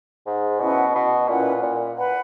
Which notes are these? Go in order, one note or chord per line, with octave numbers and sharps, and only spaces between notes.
G#2
B2 C#4 E4 B4 F#5
B2
A#2 C#4 E4 B4 F#5
A#2
B4 F#5 B5